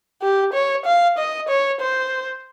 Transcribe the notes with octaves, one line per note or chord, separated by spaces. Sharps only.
G4
C#5
F5
D#5
C#5
C5